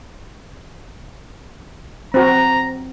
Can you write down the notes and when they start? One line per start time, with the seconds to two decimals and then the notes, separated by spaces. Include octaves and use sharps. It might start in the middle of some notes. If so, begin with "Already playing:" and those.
2.14 C4 F#4 A#5